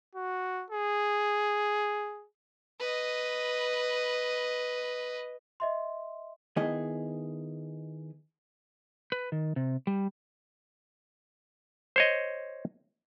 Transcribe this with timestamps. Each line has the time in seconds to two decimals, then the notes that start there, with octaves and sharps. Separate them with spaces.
0.15 F#4
0.71 G#4
2.80 B4 D#5
5.60 D#5 E5 C6
6.56 D#3 B3 E4 G#4 D#5
9.12 B4
9.32 D#3
9.56 C3
9.87 G3
11.96 C5 C#5 D#5